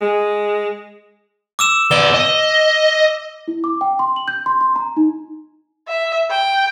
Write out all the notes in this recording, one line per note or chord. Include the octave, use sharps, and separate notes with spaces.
G#3
D6 E6 E7
B3 D5 G7
D#5
E4
D6
G5
C6
F#7
G6
C6
C6
A#5
D#4
E5
G5